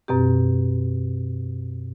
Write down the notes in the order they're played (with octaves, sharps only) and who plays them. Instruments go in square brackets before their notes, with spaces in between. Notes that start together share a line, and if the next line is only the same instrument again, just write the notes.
[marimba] F#2 B2 C4 G4